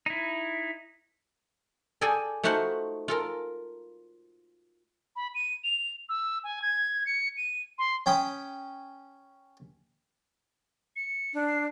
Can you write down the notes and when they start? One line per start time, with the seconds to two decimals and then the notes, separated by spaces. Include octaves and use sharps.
0.06 D#4 E4
2.01 G#4 A4 D5 G5 G#5
2.43 A3 D#4 F4 F#4 C5 F#5
3.08 F4 A4 A#4
5.16 B5
5.35 D#7
5.64 F7
6.09 E6
6.44 G#5
6.62 G#6
7.06 C#7
7.37 D#7
7.78 C6
8.06 C#4 G5 B5 D#6
10.96 C#7
11.34 D4
11.47 C7